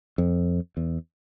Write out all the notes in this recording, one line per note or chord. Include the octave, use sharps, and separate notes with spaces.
F2
E2